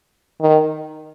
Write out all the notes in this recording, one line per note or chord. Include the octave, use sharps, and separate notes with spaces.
D#3